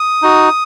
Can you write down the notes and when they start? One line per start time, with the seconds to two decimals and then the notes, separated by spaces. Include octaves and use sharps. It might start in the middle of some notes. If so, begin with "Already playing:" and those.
Already playing: D#6
0.22 D#4 F#4